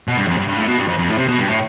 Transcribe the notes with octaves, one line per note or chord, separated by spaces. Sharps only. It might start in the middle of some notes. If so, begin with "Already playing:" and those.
B2
G2
F2
G2
G2
A2
B2
G2
F2
F2
A2
C3
B2
G2
A2